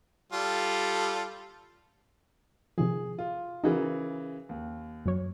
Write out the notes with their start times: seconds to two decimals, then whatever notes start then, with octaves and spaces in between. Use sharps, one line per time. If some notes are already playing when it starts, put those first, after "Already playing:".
0.32 G3 F4 A4
2.78 C3 D#3 F3 G#4
3.18 F4
3.64 C#3 E3 D#4 F#4 G#4 A#4
4.49 D#2
5.06 F#2 F#3 C#5